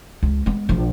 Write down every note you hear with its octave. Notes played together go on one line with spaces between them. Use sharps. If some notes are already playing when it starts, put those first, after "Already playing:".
C#2
G#3 B3
A#1 F3